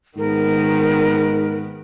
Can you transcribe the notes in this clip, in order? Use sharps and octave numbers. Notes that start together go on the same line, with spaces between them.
G#2 D#3 B3 A#4